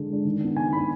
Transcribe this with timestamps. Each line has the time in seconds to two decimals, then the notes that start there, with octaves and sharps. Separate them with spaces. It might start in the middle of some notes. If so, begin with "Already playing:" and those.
Already playing: D3 G#3 D4
0.10 G#3 D4
0.25 D#3
0.41 B3 D4
0.57 D#3 G#5
0.73 B3 D4 B5